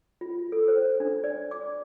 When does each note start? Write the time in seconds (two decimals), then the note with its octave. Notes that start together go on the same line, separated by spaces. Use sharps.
0.21 F4
0.52 A4
0.68 C5
1.00 D4
1.24 D5
1.51 D6